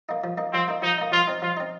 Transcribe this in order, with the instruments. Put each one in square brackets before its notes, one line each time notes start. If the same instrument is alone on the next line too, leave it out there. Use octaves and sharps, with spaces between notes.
[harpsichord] A#3 D#4
F3
A#3 D#4
[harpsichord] F3 [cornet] C4
[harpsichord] A#3 D#4
[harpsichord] F3 [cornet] D#4
[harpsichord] A#3 D#4
[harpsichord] F3 [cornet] F4
[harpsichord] C4 D#4
[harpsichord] F3 [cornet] F4
[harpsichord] C4 D#4